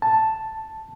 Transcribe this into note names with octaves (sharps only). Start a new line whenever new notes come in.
A5